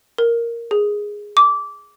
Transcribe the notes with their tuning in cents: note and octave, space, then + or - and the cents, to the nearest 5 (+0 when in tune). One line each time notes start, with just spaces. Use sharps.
A#4 +0
G#4 -5
D6 -15